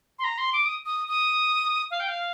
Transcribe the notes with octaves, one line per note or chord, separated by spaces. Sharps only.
C6
A#5
C6
D6
D#6
D#6
D#6
F5
G5
F5